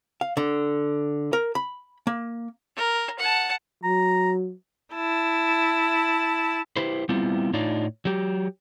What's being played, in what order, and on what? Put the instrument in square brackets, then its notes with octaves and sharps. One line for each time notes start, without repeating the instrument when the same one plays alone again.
[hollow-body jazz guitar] F5
D3
A#4
B5
A#3
[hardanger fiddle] A#4
F#5 A5
[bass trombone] F#3 [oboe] A#5
[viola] E4 A5
[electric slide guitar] E4 G4 B4 C5
G3 B3 C4 E4 F4
A2 D4 D#4 F4 C#5 D5
F#3 G4